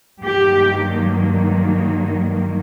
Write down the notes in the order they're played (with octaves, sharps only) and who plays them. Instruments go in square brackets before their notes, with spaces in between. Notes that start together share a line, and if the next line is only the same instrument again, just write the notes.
[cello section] G2 D#3 F#3 A#3 G4